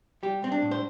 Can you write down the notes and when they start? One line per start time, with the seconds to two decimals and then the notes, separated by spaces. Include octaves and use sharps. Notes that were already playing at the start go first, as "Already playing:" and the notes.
0.23 G3 G4
0.42 G3 C4
0.52 D4
0.62 A2
0.71 C5